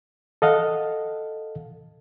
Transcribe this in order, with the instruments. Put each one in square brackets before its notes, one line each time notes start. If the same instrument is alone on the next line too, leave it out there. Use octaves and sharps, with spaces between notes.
[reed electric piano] A4 D#5 F5 F#5